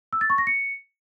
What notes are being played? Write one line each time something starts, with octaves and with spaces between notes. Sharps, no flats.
E6
A6
C#6
A#6
C#7